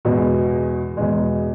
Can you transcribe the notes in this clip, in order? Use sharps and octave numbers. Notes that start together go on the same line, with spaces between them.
E2 B2 G#3
E2 B2 G#3